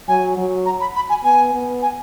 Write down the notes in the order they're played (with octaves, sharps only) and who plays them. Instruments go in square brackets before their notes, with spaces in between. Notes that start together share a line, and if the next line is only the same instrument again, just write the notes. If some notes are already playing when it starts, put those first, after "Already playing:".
[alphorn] F#3 [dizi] G#5
[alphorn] F#3
[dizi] A#5
B5
B5
G#5
[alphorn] B3 [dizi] G#5
[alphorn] B3
[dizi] G#5